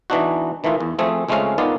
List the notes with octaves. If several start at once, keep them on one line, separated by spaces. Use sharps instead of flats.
E3 B3 D4 D#4 F#4
D#3 E3 A3 D#4 F4
E2
F3 A3 C4 G#4
C#2 G#3 A3 C4 C#4 F5
D#3 B3 D#4 F4 D5 F5